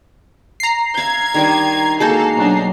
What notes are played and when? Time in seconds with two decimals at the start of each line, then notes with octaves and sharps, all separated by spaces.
0.60 A#5 C7
0.97 E5 F5 G#6
1.34 D#3 G3 D4 A#4 D5
2.00 G#3 A#3 F#4 G#4 A4 G6
2.36 B2 F#3 D4 D#4 C#5 F#5